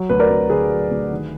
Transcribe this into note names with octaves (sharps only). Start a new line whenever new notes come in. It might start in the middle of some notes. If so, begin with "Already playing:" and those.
Already playing: F#3
D2 B4
A#4 D5
D2
D3 G#4 B4
F#3
D2
D#3